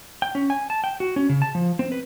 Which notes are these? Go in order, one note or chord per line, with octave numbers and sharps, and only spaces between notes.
G5
C#4
G#5
A5
G5
F#4
C#4
C#3
A5
F3
C4
B4